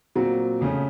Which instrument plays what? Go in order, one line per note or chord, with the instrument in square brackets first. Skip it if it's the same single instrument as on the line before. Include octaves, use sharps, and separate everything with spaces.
[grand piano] A#2 F#3 C4 F#4
F2 C#3 A3 C#4